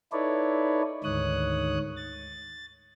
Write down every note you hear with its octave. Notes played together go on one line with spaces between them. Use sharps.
D#4 E4 A4 B4 C#5 D5
D2 G#2 D#3 C#5 D#6 F#6
A6